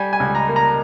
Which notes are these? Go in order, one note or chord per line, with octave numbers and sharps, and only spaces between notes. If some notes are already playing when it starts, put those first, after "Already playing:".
Already playing: G3 G#5
G#5
C#2
A#5
A#3
A#5